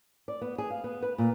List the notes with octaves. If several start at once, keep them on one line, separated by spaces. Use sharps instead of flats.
D5
B3
G#4
F5
B3
B4
A#2